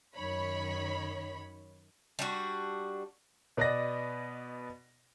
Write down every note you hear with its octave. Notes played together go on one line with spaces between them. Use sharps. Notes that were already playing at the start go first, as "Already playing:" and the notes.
F#2 D#3 C#5 B5
G3 D4 F#4
B2 B3 B4 D5 D#5 A#6